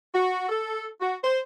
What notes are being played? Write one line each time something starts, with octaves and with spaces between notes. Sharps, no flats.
F#4
A4
F#4
C5